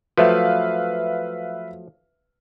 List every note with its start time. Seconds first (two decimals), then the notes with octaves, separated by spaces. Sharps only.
0.18 F3 F#3 A3 B4 E5 F5